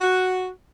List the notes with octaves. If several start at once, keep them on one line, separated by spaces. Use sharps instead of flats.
F#4